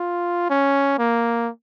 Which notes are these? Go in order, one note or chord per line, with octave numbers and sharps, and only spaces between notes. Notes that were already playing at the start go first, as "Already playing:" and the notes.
Already playing: F4
C#4
A#3